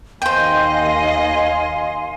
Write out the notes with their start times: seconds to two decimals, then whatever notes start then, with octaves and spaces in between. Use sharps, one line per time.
0.22 D#2 C5 D#5 F5 G5 G#5 C6